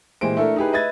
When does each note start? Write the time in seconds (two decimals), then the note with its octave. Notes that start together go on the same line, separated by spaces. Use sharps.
0.21 A#2 E3 G#3 G4 C5 D7
0.37 A3 D4 E4 A4 A#4
0.56 D#4 E4 G4 G#4 B4
0.73 B4 D#5 E5 G#6 A6